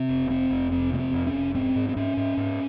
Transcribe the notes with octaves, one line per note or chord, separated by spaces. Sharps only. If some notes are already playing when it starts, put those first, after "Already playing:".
Already playing: C3 C4
F1
C3 C4
F1
F2 C4
C3 A#3
C4
F2
C#4
F1
G#2 C4
G#2
C4
G#2 C#4
G#2
G#2